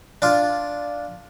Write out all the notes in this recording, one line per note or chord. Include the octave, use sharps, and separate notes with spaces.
D4 F4